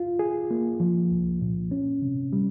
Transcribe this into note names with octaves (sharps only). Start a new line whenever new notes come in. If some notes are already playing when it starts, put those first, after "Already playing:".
Already playing: F4
G#4
A#3
F3
C2
A#2
C#4
C3
G3